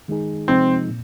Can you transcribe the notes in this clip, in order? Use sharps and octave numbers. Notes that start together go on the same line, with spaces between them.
D#3 G#3 D#4 G#4
C3 F3 G#3 C4 D#4
A#2